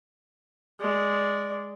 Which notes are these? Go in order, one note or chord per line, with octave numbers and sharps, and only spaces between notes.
G#3 D5